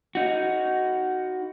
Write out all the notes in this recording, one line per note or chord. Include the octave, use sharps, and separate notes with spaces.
D#4 F#4